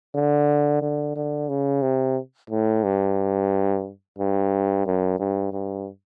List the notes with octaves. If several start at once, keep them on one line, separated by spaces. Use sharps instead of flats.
D3
D3
D3
C#3
C3
A2
G2
G2
F#2
G2
G2